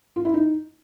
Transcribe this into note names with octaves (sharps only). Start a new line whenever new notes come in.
F4
E4
D#4